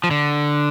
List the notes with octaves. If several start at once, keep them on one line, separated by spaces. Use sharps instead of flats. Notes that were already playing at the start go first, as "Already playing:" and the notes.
F3
D3